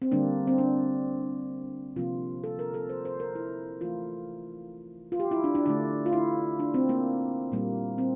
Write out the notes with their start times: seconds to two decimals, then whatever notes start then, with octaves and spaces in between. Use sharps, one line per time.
0.02 C4
0.12 D3 G3 A#3 D4
0.47 C4
0.58 D4
1.96 C3 F3 A#3 F4
2.44 A4
2.59 A#4
2.74 A4
2.89 C5
3.05 C5
3.20 A#4
3.35 E4
3.81 E3 A3 F4
5.12 F4
5.20 G4
5.31 E4
5.44 D4
5.55 D4
5.66 D3 A3 D4
6.06 F4
6.13 E4
6.59 D4
6.74 C4
6.89 A#3
7.52 A#2 G3 A#3
7.98 C4